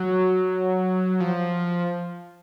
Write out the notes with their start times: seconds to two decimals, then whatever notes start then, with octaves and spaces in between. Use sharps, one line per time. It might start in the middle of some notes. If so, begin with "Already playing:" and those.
Already playing: F#3
1.20 F3